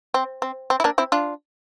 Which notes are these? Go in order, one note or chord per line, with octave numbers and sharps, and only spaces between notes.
C4
C4
C4
E4
A#3 D4
C4 E4
D4 F4